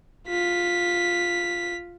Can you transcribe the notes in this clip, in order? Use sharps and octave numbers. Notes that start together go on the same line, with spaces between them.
F4 B6